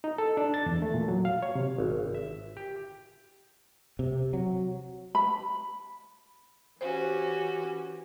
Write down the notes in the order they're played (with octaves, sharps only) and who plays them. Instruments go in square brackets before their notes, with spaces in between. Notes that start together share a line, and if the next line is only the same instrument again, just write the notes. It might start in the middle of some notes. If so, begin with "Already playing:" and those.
[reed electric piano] D#4
A4
D4
A6
E2
A3
A#2
F#3
F5
C#5
C3
[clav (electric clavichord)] G#1
E5
G4
[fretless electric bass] C3
F#3
[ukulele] B5
[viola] E3 G4 [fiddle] C#4 F#4 [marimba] C5